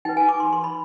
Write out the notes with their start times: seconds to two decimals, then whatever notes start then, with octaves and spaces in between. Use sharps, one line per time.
0.05 D#4 B4 G5
0.17 G#5
0.29 D6
0.40 C6
0.53 C6
0.64 B5